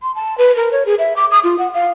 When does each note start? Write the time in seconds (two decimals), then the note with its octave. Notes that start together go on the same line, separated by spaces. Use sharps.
0.02 C6
0.15 A5
0.38 B4
0.56 A#4
0.72 C#5
0.86 G#4
0.99 E5
1.16 D6
1.31 D#6
1.44 F4
1.59 F#5
1.74 F5